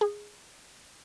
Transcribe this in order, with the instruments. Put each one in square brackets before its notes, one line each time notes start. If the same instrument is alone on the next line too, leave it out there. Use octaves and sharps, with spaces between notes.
[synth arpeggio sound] G#4